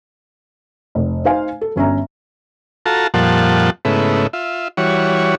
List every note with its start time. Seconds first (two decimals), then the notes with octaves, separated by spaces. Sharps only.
0.95 F1
1.25 D#4 C5 F5 G#5
1.61 A4
1.76 G1 C#4 E5 A#5
2.86 F4 F#4 A4 A5 A#5
3.14 F2 A#2 F3 G3 F#5 A5
3.85 G#2 C#3 A3 B3 E4
4.33 F4 E5
4.77 E3 G3 F#4 C#5